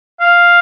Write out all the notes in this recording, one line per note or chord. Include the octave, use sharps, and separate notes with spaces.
F5